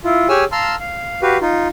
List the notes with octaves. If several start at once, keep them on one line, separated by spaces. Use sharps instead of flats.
E4 F4
G4 G#4 C#5 G#5 E6 F6
F5 A5 A#5 C6 E6 F6
F5
F#4 G4 B4 F5
D#4 F4